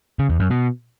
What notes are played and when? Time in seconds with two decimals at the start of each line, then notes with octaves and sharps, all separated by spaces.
0.19 C#3
0.30 E2
0.40 F#2
0.50 B2